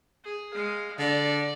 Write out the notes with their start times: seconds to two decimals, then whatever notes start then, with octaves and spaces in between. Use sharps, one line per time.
0.24 G#4
0.54 G#3 F5
0.98 D3 D5